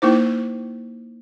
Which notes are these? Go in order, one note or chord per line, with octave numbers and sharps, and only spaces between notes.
A#3 D#4 E4 C5